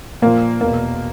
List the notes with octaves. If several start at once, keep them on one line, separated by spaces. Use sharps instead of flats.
A#2 F3 A#3
E2 B2 A#3